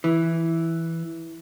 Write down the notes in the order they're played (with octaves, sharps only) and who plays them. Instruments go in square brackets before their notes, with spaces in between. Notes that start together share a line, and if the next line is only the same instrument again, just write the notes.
[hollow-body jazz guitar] E3